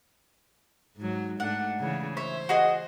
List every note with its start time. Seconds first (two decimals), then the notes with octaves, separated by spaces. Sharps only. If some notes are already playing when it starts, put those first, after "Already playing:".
0.96 G#2 F#3
1.40 G#2 A3 D4 F#5
1.80 C#3 E3
2.17 C5 C#5 E5
2.49 F#4 G#4 D#5